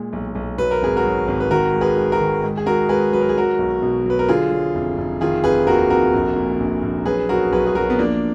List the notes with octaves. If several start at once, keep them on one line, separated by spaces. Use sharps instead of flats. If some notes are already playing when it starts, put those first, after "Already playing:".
Already playing: A#2 G#3
B1
B1
F#3 B4
A#4
G#1 G#4
F#4 A#4
F#3
G#1
B4
D#3 F#4 A#4
G#3
G#4 B4
G#3
F#4 A#4
D#3
G#2
G#4
G#2 F#4 A#4
G#2 G#4 B4
F#3 B4
A#4
G#4
F#3 F#4 A#4
B1
B2
F#3 B4
A#4
D3 F4 G#4
F#3
F1
F1
D#3 F4 G#4
F1 G#4 B4
D#2 F#4 A#4
F1 F#4 A#4
A#1
A#2
A#1
A#1
F#3 G#4 B4
B1 F#4 A#4
B1 G#4 B4
G#4
F#3 F#4 A#4
B3
F3 A#3 D4